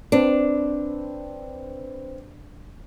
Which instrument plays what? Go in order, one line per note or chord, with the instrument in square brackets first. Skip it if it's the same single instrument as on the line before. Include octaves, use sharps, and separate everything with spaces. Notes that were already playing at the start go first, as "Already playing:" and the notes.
[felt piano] C4 B4 [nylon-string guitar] D4